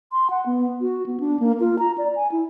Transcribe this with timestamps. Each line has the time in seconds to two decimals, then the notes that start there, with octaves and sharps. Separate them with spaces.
0.12 C6
0.30 F#5
0.46 B3
0.81 F#4
1.06 B3
1.20 D4
1.40 A#3
1.60 F4
1.79 A#5
1.98 D5
2.15 G#5
2.32 E4